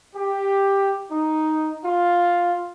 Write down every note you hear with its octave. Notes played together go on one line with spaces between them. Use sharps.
G4
D#4
F4